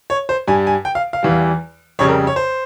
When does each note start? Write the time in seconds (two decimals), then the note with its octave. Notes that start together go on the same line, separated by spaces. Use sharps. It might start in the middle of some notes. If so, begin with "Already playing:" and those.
0.10 C#5
0.29 C5
0.47 G2 G3 G#5
0.67 G#5
0.85 G5
0.95 F5
1.13 F5
1.23 E2 E3 G3
1.99 F2 C#3 G3 C#5
2.08 A#4
2.27 C#5
2.36 C5